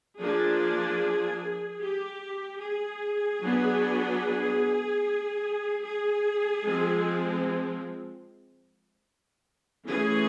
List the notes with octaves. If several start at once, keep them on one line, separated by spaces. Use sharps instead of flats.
F3 A#3 D4 G#4
G4
G#4
F#3 B3 D4
G#4
F3 G#3 C4
E3 A3 C#4 G#4